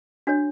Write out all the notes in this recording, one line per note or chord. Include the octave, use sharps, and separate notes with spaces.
D4 F#4 C#5